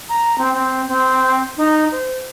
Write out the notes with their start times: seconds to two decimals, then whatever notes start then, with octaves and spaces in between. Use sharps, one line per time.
0.09 A#5
0.38 C4
0.54 C4
0.88 C4
1.57 D#4
1.92 C5